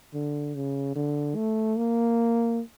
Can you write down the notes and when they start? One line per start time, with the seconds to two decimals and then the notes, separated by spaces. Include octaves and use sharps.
0.14 D3
0.55 C#3
0.96 D3
1.36 A3
1.78 A#3